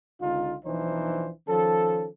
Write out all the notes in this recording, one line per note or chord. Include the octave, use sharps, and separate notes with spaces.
C#2 D3 D#4 F4
B1 E3 F3 D4 D#4 C5
D#3 F3 C#4 A4